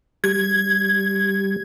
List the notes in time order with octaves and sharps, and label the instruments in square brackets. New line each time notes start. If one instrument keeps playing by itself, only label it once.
[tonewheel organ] G3 [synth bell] G#6